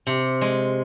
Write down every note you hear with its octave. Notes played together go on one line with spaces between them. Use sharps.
C3
G#3